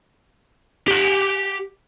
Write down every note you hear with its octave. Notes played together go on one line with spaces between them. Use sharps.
G4 F#5